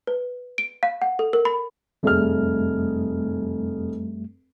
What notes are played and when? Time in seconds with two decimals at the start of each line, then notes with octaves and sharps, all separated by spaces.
0.07 B4
0.58 D7
0.83 F5
1.02 F#5
1.19 A4
1.33 A#4
1.45 B5
2.03 F1 F#2 G3 A3 G#4 F6